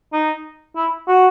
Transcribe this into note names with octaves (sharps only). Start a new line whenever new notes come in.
D#4
E4
F#4